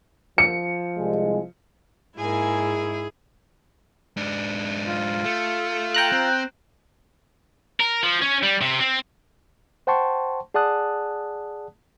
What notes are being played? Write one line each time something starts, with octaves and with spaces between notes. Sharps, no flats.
F3 C#7
C2 G#3
G#2 A#3 E4 G#4 G#5
G#2 D4
F4
A3
G5 A#5 F#6
C4
A#4
F3
C#4
G3
C3
C4
C5 F#5 G5 A5 C6 C#6
G#4 D5 F#5 A5 D#6 F#6